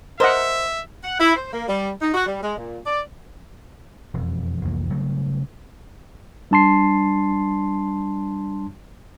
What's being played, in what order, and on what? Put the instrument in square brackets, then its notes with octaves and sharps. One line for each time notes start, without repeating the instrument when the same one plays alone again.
[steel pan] A#4 D#5 F#5 [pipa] C5 [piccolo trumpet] E5
[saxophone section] F#5
E4
C5
A#3
G3
D#4
F#4
G3
G#3
A#2
D5
[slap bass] E1 F2
C2 F2 E3 A#3
C#3 F#3 G3 A3
[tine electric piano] G3 D4 A5 C6 C7